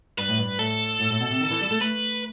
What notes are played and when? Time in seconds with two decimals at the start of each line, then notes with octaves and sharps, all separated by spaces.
0.18 G2 B4
0.28 A2
0.38 G2
0.58 A2 A4
1.00 A2
1.10 A2
1.20 B2
1.30 C3
1.40 D#3
1.50 E3
1.61 G3
1.71 A3
1.81 A3 B4